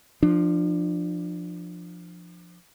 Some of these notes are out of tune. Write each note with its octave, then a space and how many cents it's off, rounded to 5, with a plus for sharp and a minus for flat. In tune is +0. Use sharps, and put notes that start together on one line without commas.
F3 +0 D4 +30